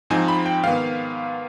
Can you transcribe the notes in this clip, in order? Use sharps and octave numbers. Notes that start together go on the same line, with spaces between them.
G#2 F3 C4 D#4 G#5
B5
G5
G#2 D#3 B3 F5